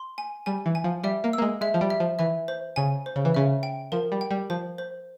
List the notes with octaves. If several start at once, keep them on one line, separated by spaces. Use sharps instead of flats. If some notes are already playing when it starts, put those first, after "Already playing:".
Already playing: C6
G#5
G3 G#5
E3
G#5
F3
G3 E5
A#3
E6
A#3
G#3
G#3 E5
F3
G3
E5
F3
E3 E5
C5
C#3 G#5
C5
C#3
E3
C#3 E5
G5
F3 A#4
G3
G5
G3
F3 C5
C5